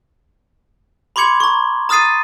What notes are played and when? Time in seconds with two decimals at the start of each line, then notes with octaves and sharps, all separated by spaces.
1.16 B5 C6 D6 G#6 C#7 F#7
1.40 A#5 C#6
1.89 A#5 D#6 F6 A6 C7 D#7